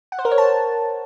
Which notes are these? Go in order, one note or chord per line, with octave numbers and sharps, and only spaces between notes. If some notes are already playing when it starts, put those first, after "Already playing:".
F#5
C5
A#4
C#5
A5